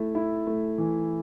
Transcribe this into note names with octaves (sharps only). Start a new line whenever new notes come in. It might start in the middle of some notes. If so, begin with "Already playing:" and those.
Already playing: A3 E4
E4
A3
E3